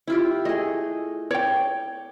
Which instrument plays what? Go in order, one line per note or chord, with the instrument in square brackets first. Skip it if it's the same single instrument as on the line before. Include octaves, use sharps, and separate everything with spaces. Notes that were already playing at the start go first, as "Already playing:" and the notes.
[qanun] E4 F4 G4
[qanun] A3 G#4 [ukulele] D#5
[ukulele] C#5 G5 [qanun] D5